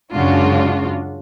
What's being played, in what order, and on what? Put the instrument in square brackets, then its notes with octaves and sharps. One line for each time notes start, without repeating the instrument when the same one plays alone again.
[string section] F#2 C#3 G#3 D4 F4 F#4